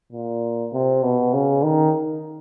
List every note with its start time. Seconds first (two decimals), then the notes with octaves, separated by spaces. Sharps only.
0.12 A#2
0.73 C3
1.03 B2
1.34 C#3
1.64 D#3